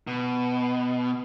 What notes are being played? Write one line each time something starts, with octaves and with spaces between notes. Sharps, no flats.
B2